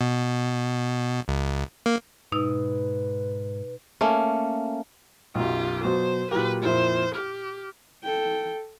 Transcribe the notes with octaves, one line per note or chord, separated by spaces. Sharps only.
B2
C#2
A#3
G#2 B2 D#4 B4 E6
A3 A#3 C#4
B1 F#2 F4 G4
B2 F#3 C5
A#2 F#3 G4 B4
F2 A#2 E4 C5
G4 F6
A4 G5